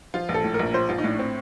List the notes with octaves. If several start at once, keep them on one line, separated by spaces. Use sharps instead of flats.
F3 F4
A#1
A4
A2
A#4
A#1
F3 C5
A#1 F4
D#4
A2 D4
C4